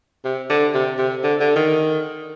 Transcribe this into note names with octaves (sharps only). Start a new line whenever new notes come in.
C3
D3
C3
C3
D3
D3
D#3